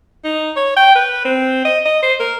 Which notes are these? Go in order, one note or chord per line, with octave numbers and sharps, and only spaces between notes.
D#4
C#5
G5
B4
C4
D#5
D#5
C5
A#4